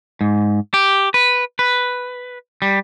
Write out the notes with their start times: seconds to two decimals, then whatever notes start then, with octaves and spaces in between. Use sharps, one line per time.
0.21 G#2
0.74 G4
1.14 B4
1.59 B4
2.62 G3